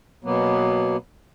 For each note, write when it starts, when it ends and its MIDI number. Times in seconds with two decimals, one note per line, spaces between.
0.24 0.97 47
0.24 0.97 54
0.24 0.97 58
0.24 0.97 59